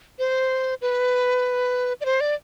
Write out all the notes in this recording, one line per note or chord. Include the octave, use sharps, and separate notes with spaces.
C5
B4
D5
C5
D5